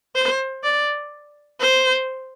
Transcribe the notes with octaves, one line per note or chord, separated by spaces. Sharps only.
C5
D5
C5